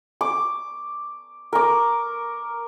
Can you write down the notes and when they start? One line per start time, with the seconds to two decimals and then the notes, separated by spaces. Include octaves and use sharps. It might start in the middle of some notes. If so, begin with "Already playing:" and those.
0.21 D6
1.53 A#4 D6